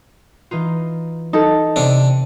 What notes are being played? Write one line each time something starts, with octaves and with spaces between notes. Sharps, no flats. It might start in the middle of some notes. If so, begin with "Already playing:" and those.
E3 D#4 F4
D#4 A4 A5 A6
C3 D4